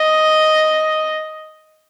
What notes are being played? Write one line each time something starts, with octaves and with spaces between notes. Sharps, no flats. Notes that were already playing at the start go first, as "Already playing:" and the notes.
Already playing: D#5